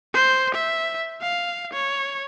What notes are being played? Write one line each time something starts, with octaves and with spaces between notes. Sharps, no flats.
C5
E5
F5
C#5